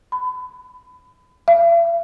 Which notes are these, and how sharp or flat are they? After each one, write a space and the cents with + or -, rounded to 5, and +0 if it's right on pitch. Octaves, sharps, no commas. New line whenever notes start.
B5 +30
E5 +45